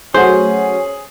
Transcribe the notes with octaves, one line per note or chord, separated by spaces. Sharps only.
F#3 A3 C#4 F#4 G#4 C5